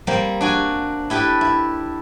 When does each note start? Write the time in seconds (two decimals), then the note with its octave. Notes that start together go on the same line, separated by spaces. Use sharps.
0.07 G3 A#3 C4 C5
0.41 D4 F#4 G#5
1.10 E4 G4 A4 B4
1.41 E4